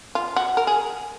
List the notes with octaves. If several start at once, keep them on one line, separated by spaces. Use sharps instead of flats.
F4
F#4
A#4
G#4